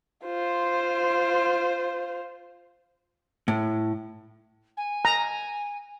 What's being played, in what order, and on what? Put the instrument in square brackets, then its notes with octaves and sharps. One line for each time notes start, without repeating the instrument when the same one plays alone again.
[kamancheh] F4 C5
[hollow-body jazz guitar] A2
[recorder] G#5
[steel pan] A#5